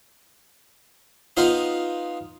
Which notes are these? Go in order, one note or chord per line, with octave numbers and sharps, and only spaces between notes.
B3 D#4 F4 C5